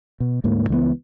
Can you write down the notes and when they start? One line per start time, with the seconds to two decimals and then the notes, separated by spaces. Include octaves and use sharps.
0.20 B2
0.44 D2 G#2 A#3
0.69 C#2 E3 G3 B3